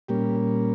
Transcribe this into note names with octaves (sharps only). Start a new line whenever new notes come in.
A#2 G3 A#3 C#4 G4